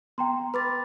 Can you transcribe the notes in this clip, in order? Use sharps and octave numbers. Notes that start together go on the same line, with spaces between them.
B3 G5 A#5 C6
B4 B5 D6 A6